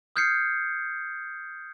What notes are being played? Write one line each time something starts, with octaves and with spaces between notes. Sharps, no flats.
D#6 F6 G6 G#6 C7 C#7